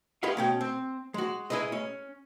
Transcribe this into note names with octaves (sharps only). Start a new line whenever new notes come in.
G4 G#4 B4 D#5 F5
B2 C#4 G5
C4
G#3 F#4
G#3 E4 G#4 B4 D#5
C#4